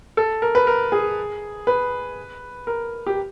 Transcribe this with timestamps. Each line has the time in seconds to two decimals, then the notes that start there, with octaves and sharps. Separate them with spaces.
0.17 A4
0.42 A#4
0.55 B4
0.67 A#4
0.92 G#4
1.67 B4
2.67 A#4
3.07 G4